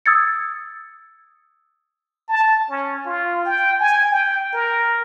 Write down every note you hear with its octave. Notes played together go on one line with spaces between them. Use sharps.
D#6 E6 G#6 A6 C#7
A5
C#4
F4
G5
G#5
G5
A#4